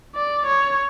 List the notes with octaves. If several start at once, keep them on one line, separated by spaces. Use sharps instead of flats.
D5
C#5